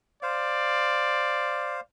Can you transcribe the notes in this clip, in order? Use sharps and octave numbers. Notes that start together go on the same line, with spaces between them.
C5 D5 F5